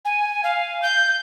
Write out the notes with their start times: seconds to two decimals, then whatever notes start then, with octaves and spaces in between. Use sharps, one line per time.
0.05 G#5
0.43 F5
0.82 G6